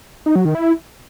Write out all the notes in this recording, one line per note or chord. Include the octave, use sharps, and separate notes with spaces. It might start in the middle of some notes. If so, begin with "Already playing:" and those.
D#4
F#3
D#3
E4